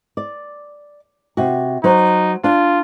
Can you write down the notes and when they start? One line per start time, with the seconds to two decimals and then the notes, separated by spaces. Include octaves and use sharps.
0.17 D5
1.37 C3 F#4
1.84 F#3 D#4 C5
2.44 D4 F4